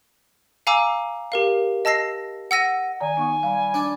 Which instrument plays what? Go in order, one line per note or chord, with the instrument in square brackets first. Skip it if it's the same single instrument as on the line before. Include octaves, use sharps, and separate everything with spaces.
[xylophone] F5 G#5 A#5 D6 E6
G4 A#4 F5
D#5 A5 E6 A#6 C7
F#5 E6 A#6 D#7
[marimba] D#3 D5 A#5 [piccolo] G#5
[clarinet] B3 [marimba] D#4 C#6
[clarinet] G3 [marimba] F5
[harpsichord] D4